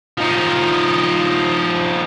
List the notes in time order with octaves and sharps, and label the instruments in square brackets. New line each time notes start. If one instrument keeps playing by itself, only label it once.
[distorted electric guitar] F3 D#4